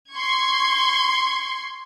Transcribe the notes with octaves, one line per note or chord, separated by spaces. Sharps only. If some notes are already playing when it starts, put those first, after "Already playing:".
C6 C#6 G#6